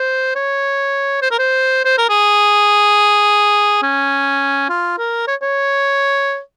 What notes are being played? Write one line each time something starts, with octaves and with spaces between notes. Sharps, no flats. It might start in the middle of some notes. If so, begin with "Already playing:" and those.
Already playing: C5
C#5
C5
A#4
C5
C5
A#4
G#4
C#4
F4
A#4
C#5
C#5